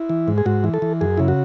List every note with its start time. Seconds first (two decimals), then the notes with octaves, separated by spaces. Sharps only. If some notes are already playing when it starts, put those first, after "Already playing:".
Already playing: E4
0.09 E3
0.28 G#2
0.38 G#4
0.46 G#2 F#4
0.64 E3
0.74 A4
0.82 E3
1.01 F#2 G#4
1.17 C#3 E4
1.28 F#4